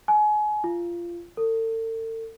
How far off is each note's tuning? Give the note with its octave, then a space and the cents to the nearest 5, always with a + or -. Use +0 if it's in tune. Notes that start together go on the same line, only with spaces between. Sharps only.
G#5 +30
F4 -20
A4 +40